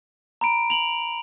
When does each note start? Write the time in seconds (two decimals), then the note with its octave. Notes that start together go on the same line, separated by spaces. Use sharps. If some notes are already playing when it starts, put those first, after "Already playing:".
0.41 A#5 B5 D7
0.70 F7 F#7